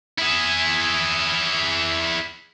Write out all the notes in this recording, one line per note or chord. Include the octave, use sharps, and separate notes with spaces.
E4 G#4